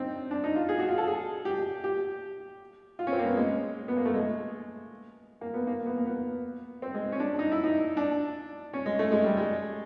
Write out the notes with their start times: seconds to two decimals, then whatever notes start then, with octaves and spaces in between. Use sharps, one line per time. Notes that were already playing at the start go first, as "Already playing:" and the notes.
Already playing: C4 D4 D#4
0.31 D4
0.44 D#4
0.56 F4
0.69 G#4
0.79 F#4
0.88 F4
0.98 A4
1.07 G#4
1.45 G4
1.84 G4
2.99 F4
3.07 C#4
3.12 C4
3.19 A#3
3.25 B3
3.37 G#3
3.88 B3
3.97 A#3
4.05 A3
4.14 G#3
5.41 A#3
5.54 B3
5.67 A#3
5.86 B3
5.98 A#3
6.06 B3
6.82 C4
6.95 G#3
7.12 C#4
7.20 D4
7.39 D#4
7.52 E4
7.64 D#4
7.97 D4
8.73 C#4
8.86 G#3
8.99 A3
9.12 G#3
9.24 G3
9.37 G#3